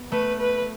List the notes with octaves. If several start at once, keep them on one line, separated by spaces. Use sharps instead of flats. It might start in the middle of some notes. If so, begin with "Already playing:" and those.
Already playing: B3
A3 B4
B4